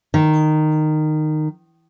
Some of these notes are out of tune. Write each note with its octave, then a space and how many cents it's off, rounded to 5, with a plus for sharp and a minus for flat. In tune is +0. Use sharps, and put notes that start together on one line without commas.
D#3 -15